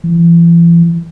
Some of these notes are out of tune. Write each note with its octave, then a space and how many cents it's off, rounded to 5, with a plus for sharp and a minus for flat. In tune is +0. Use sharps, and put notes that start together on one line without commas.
E3 +40